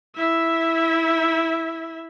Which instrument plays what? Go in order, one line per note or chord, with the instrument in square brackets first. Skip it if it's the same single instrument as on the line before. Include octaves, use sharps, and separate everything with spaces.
[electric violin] E4 E5